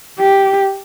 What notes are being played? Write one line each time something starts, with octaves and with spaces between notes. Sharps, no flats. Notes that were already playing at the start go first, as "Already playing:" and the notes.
G4